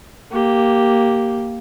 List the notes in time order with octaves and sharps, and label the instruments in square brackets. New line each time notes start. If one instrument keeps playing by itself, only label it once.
[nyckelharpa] A#3 G4